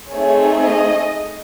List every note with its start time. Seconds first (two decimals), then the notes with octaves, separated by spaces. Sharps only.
0.11 A3 C4 D#4 G#4 C#5
0.63 D#5